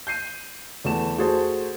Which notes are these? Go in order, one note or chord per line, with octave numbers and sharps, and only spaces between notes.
G6 C7 D#7
E2 A3 E7
A3 F#4 G#4 A4 C5